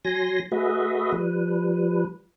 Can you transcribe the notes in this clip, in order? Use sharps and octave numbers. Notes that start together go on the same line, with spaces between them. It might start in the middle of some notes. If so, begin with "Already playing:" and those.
F#3 G#5 C6 A#6
A3 F#4 G#4 B4 D#5 E5
F3 G3 B4